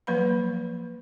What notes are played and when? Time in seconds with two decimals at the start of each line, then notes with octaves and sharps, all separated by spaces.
0.07 F3 F#3 A#3 B4 F5 B5